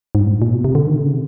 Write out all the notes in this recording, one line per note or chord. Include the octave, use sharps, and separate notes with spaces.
G#2
G2
A2
G#2
A#2
B2
C3
D3
D#3
D3
C#3
C3